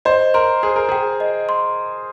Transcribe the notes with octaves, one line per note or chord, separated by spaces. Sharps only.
C5 D#5
A#4 C6
G#4 C5
A#4
G#4 G5
D#5
C6